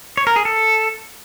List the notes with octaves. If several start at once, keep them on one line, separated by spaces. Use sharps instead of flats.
C#5
A#4
G#4
A4